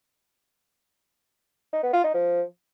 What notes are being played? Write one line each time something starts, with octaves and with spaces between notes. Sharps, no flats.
D#4
B3
F4
D#4
F3